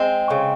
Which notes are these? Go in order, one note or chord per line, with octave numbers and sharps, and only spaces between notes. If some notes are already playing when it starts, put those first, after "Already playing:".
Already playing: G#3 C4
C#3